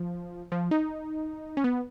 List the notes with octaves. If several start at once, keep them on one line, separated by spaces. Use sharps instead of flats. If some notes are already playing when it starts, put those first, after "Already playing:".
Already playing: F3
F3
D#4
C#4
B3